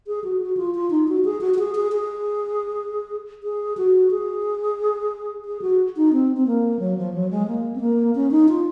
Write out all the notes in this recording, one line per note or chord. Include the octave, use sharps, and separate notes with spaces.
G#4
F#4
F#4
F4
F4
D#4
F#4
G#4
F#4
F#4
G#4
G#4
G#4
G#4
F#4
G#4
G#4
F#4
D#4
C4
C4
A#3
F#3
F3
F#3
G#3
A#3
C4
A#3
C#4
D#4
F4